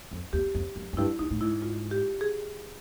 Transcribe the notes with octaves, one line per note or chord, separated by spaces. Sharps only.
F2
E2 G4
F2
F#2
F#2
G2 E4
G2 D#4
A2
G#2 E4
F4
G4
G#4